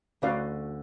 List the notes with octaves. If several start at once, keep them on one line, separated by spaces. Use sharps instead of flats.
D2 D3 C#4 F#4 B4 D5 F5